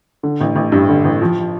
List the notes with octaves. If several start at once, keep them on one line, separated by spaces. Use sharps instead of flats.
D3
A1
A1
G2
D3
A1
F3